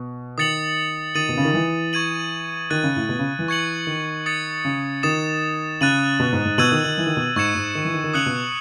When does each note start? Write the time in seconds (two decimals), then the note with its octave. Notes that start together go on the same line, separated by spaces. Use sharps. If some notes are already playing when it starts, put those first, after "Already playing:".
Already playing: B2
0.38 D#3 D#6 A6 C#7 F#7
1.15 D#3 D#6 A6 D#7 F#7
1.29 B2
1.37 C#3
1.45 D#3
1.54 E3
1.93 C#6 G#6 D#7 F#7
2.70 D#3 F#6 A6 D#7
2.83 C#3
2.96 A2
3.09 B2
3.19 C#3
3.39 E3
3.48 C#6 G#6 C#7 F#7
3.87 D#3
4.26 D#6 A6 C#7
4.65 C#3
5.03 D#3 D#6 A6 E7
5.81 C#3 F#6 A6 D#7 F#7
6.20 B2
6.33 G#2
6.45 G#2
6.58 B2 E6 G#6 D#7 F#7
6.72 D#3
6.84 D#3
6.98 E3
7.06 D#3
7.17 B2
7.36 G#2 C#6 G#6 C#7 E7
7.55 G#2
7.75 D#3
7.85 E3
7.94 D#3
8.04 D#3
8.14 C#3 D#6 F#6 C#7 F#7
8.26 B2